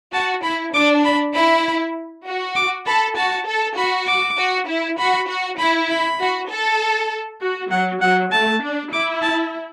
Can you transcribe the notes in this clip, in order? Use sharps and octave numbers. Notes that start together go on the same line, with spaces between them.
F#4 A5
E4 B5
D4 D6
B5
E4 B5
F#4
D6
A4 B5
F#4 A5
A4
F#4 B5
D6
F#4
E4
F#4 B5
F#4
E4 B5
B5
F#4
A4
F#4
F#3 F#5
F#3 F#5
A3 A5
D4
E4 D6
A5